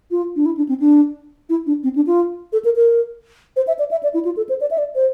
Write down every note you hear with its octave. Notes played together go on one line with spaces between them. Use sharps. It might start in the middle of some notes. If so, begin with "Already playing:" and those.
F4
D4
E4
D4
C4
D4
E4
D4
C4
D4
F4
A4
A#4
A#4
C5
E5
D5
E5
D5
E4
F4
A4
C5
D5
E5
D5
C5